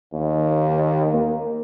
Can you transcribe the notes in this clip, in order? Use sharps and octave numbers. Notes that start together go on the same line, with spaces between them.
D#2
A#3